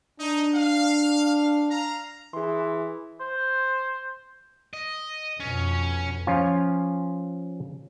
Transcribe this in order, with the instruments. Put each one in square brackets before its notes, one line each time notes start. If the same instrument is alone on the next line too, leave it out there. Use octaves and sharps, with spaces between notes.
[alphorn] D4 [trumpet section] D#4
[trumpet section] F5
F5 A#5
[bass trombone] E3 [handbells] G#4 C6
[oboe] C5
[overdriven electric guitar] D#5
[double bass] F2 B2 [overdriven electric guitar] C#4
[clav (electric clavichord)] F3 C#4 F4